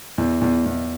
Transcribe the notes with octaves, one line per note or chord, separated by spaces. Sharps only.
E2
E2
E2